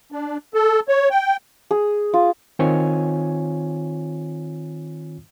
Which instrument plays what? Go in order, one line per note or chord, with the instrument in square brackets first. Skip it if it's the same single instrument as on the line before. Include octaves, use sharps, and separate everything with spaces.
[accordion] D4
A4
C#5
G5
[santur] G#4
F4
[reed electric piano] D#3 C4 F4 C#5 G#5